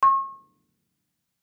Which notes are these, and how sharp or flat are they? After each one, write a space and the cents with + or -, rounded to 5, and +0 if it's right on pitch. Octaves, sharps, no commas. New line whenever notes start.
C#6 -40